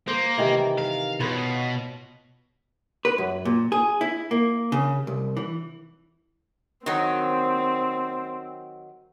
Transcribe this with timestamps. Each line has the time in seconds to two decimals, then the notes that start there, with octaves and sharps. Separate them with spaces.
0.08 A#3 C5
0.38 C3 D#3 E3
0.78 A#4 F5
1.20 B2 F4 B4 C#5
3.05 B4
3.18 F#2
3.45 A#2
3.72 G#4
4.01 E4
4.31 A#3
4.72 C#3
5.07 C2
5.37 E3
6.86 D#3 F#3 C4